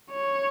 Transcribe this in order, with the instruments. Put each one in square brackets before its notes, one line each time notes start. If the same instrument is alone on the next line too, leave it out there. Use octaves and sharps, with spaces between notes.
[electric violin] C#5